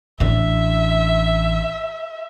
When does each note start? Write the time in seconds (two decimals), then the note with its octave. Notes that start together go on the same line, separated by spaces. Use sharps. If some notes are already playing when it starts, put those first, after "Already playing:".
0.20 A1 D4 E5